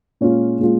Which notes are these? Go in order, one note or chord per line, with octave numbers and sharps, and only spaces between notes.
A#2 G#3 C#4 F4
A#2 G#3 C#4 F4